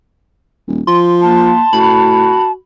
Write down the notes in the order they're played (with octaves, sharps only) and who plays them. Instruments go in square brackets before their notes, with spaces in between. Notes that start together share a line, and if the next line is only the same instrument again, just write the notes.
[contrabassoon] D#1
[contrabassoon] F3 [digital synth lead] C6
[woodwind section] A#3 [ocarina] A5
[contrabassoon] A2 [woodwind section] F#4 [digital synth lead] B5